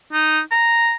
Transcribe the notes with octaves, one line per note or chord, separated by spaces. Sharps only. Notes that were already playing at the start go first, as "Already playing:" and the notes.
D#4
A#5